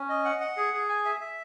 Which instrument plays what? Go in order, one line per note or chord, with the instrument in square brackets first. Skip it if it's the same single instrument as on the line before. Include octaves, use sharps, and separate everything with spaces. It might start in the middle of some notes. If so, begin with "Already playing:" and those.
Already playing: [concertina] C#4
D#5
F#5
F#5
G#4
G#4
G#5
E5
E5